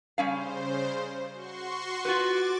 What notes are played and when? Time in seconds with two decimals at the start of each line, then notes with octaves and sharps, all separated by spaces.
0.18 C#3 G3 C#4 C5 F5
1.32 F#4 C6 C#6
2.05 F4 F#4 B4 D6 A6